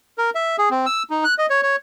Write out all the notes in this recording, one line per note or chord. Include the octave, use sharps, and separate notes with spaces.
A#4
E5
G#4
C4
E6
D#4
F#6
D#5
C#5
C#5